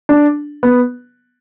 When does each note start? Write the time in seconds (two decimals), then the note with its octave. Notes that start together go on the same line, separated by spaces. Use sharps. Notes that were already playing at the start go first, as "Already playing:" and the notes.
0.09 D4
0.63 B3